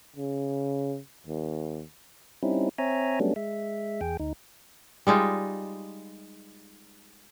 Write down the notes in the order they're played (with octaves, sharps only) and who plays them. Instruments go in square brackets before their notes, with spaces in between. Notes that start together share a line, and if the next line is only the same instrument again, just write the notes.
[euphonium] C#3
D#2
[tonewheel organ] G3 C4 C#4 D#4 E4
C4 C#5 E5 G#5 A#5
F#3 G3 A3 B3 C#4 D4
G#3 E5
E2 G#4 G5
D2 D#4
[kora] G3 G#3 D#4 F4